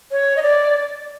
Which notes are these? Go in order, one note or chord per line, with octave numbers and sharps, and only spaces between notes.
C#5
D#5
D5